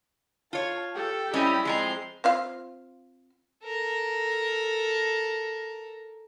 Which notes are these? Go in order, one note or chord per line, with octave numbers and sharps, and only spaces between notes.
F4 C#5 A5
G4 A4 G5
G3 C4 C#4 E4 D#5
F3 G#3 C4 G#4 A#5 C6
C4 F4 F5
A4 A#4